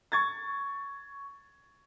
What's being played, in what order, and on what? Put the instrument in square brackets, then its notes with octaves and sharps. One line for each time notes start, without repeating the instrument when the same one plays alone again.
[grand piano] C#6 G#6 A6